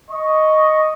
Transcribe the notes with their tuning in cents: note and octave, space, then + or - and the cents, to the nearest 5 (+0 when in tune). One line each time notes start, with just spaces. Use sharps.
D#5 +0 C#6 +0